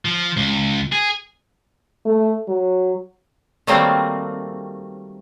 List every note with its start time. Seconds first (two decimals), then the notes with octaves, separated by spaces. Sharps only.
0.05 F3
0.37 C#2
0.92 G#4
2.05 A3
2.48 F#3
3.67 D#3 F#3 G3 A3 A#3 C4